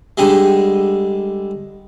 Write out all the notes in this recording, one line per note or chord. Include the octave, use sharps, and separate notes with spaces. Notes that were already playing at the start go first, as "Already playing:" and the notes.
D3 G3 G#3